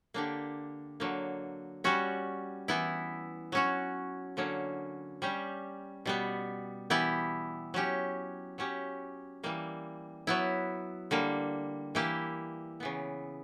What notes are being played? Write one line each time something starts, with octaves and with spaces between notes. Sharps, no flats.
D3 A#3 D4 G4
D3 F#3 A#3
G3 C#4 F#4
E3 B3 E4
F#3 C#4 F#4
D3 F#3 A#3 C#4
G3 C#4 G4
B2 G3 B3
E3 B3 E4 G4
F#3 C#4 G4
F#3 C#4 G4
E3 G3 A#3
F#3 B3 E4
D3 G3 A#3
E3 A#3 E4 G4
C#3 E3 B3